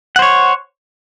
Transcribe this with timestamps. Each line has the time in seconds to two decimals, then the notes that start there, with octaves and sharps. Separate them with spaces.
0.16 F#5
0.19 C5
0.22 C#5